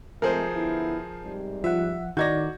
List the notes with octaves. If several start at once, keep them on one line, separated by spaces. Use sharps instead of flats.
F3 G#3 A3 C4 G#4 A#4 C5
D3 B3 E4
G#2 C3 G3
F3 E5 F#5
A2 D#3 D#4 F#4 D5 G6 G#6 A#6